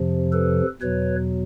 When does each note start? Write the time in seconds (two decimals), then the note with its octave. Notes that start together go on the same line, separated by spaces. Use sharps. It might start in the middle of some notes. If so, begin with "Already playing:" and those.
Already playing: F2 C3 F3
0.32 A4 B4
0.81 E2 B2 F#3 B4 C#5